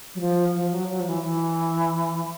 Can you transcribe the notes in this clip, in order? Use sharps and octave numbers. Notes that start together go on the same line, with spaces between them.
F#3
F3
F3
F#3
F#3
F3
E3
E3